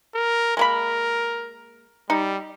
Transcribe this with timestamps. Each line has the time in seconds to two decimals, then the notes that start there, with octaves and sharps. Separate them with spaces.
0.15 A#4
0.57 G#3 A#3 A#4 B5
2.10 G3 D#4